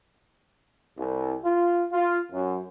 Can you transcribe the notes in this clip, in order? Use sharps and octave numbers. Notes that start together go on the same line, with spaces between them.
C2
F4
F4
F#2